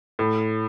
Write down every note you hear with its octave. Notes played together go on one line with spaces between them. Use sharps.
A2